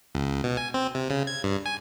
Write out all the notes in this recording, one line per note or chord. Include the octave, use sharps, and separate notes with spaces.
C#2
B2
G#5
C4
C3
C#3
G#6
G2
G#5